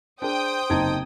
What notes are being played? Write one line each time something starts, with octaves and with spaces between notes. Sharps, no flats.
D4 G#4 C5 G5 D#6
F#1 C3 D#4 A5 A#5 G#6